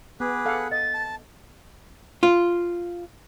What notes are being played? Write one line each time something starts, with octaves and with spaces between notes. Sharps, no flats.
B3 G#4 B4 D6
A4 F5 F#5
D#5 A6
A5
F4